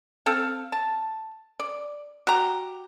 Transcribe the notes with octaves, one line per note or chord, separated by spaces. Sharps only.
C4 A4 F5
A5
D5
F#4 G4 A#5